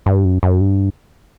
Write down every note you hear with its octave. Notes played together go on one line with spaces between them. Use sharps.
G2
F#2
F#2
G2